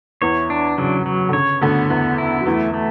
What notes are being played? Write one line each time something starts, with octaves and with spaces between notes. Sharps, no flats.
E2 E3 C#5
D4
C#3 F#3
F#3
D3
C#3 C#5
D2 D3 B3
E2 E3 B3
E4
F#3
E2 E3 A3
A3